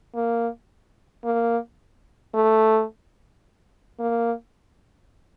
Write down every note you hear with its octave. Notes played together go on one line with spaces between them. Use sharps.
A#3
A#3
A3
A#3